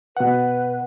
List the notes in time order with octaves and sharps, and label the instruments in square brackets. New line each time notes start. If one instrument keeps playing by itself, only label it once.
[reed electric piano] B2 F#5 [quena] B4